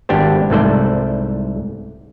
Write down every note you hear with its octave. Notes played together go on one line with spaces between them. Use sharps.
G#1 B3 D4 G4 C5
C2 G#2 A3 A4 C5 D5